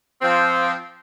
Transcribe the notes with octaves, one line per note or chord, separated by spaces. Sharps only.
F3 C4